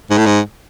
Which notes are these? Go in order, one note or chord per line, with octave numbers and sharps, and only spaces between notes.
G#2
A2
G#2